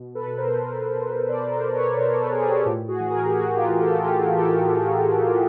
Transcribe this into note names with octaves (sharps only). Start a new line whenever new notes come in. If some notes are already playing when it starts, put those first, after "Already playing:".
Already playing: B2
A4 B4
B2
A#4 C5
B2
B2
B2 C5 D5
A#4 C5
B2
B4 C#5
B2 A#4 C5
A4 B4
B2 G#4 A#4
G#4
G4 A4
A2 F4 G4
F#4 G#4
E3
G#4 A#4
G4
A2 F#4 G#4
F4 G4
E3
G4 A4
E3 F4 G4
E3 G4 A4